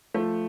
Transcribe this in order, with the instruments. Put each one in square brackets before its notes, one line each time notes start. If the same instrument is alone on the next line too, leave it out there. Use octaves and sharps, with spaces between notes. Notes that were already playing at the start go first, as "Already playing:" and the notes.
[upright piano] F3 A3